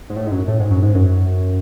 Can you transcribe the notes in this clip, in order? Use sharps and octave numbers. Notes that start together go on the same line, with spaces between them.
G#2
A2
G#2
F#2
A2
G#2
F#2
G#2
F#2